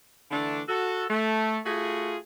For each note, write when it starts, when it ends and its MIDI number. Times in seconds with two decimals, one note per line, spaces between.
0.31 0.61 50
0.31 0.61 52
0.31 0.61 57
0.31 0.61 62
0.68 1.05 66
0.68 1.05 69
1.10 1.58 57
1.65 2.16 57
1.65 2.16 65
1.65 2.16 66
1.65 2.16 68